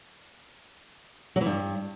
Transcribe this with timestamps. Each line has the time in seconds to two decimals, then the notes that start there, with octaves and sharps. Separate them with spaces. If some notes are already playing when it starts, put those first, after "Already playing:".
1.36 F#3
1.41 E3
1.46 G2